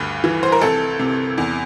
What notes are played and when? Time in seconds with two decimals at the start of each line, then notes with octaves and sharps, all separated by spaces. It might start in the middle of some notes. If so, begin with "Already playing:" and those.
Already playing: D2 G2
0.24 E3
0.43 C5
0.52 A#4
0.61 C2 A4
0.99 C3
1.38 E2